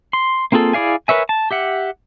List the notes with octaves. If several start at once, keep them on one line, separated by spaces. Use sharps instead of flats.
C6
A#3 C4 F4 G#4 A4
E4 G#4 D5 F5 G#5
A#4 B4 C#5 E5 G#5
A5
G4 E5 F#5